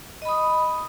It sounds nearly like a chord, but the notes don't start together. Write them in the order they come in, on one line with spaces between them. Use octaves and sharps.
D#5 B5 D#6